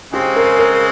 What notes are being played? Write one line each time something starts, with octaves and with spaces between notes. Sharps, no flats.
C#3 G#3 C4 G4
A#4
A#4